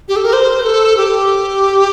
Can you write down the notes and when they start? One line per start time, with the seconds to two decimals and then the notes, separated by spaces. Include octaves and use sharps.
0.09 G4
0.16 A4
0.24 A#4
0.33 C5
0.66 A4
0.97 G4